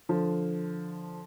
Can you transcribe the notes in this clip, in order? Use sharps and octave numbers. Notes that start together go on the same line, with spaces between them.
D3 F3